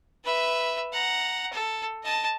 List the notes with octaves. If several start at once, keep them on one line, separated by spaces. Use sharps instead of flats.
B4 E5
F#5 A#5
A4
D#5 A5